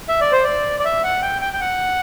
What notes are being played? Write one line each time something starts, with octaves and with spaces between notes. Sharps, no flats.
E5
D5
C5
D5
D5
E5
F#5
G5
G5
G5
F#5